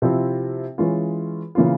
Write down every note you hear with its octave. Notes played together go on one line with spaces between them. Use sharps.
C3 F3 C4 E4
E3 G#3 C#4 F4
C#3 E3 A#3 C#4 F4